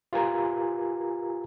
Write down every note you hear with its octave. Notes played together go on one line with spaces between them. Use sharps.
F4 G4 A#4 B4 G#5 A#5